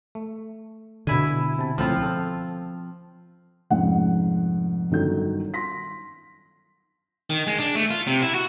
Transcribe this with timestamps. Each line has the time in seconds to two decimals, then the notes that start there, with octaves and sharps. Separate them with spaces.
0.15 A3
1.07 B2 D3 E4 G#5
1.58 C3 A5
1.78 C#2 A2 F3 C4 F4
2.02 A4 C5
3.70 F1 G#2 C#4 F#5
4.91 G1 D#3 F#3 A4 G6
5.54 C6 A#6 B6
7.30 D#3
7.47 G#3
7.58 D4
7.75 A3
7.91 F4
8.07 C3
8.22 E4
8.34 F#4